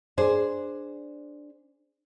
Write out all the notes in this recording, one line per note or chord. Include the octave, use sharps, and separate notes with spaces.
D4 G#4 C5